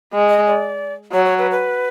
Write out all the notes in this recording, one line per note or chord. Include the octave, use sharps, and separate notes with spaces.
G#3
D#5
D5
F#3 C#5
C#5
B4
B4